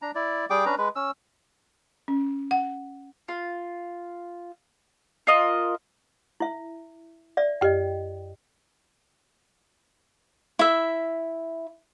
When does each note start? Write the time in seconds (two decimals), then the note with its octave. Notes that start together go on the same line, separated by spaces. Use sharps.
0.02 D4 A#5
0.15 E4 D5
0.50 G3 G#4 G5 D6
0.66 C#4 D4 B4 A#5
0.78 G#3 B4
0.96 C#4 E6
2.08 C#4
2.51 F#5
3.28 F4
5.27 F4 A#4 D#5
6.40 E4 E5
7.37 D5 E5
7.61 F#2 G4 D#5 G5
10.59 E4 E5